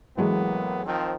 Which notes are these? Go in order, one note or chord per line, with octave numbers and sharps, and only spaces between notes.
A2 E3 F#3 G#3 A#3 B3
D#3 F3 C4